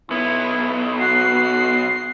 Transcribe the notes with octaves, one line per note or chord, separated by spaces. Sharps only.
B1 B3 E4
F#4 C7